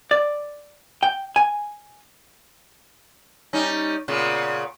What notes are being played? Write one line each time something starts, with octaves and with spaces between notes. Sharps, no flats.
D5
G5
G#5
G3 C#4 D#4
A#2 C#3 B3